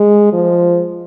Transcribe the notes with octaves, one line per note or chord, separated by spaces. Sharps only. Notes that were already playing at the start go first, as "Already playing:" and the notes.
Already playing: G#3
F3